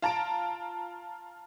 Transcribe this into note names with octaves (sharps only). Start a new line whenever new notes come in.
F4 A5 A#5 D7